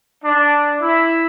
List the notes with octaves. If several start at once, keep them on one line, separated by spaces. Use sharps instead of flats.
D4
E4